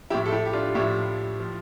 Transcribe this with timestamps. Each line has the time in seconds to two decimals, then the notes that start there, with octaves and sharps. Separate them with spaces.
0.10 A2 F3 E4 G4
0.26 A4
0.32 E4 G4
0.45 G4
0.53 D4 F4
0.75 A2 F3 E4 G4
1.40 F3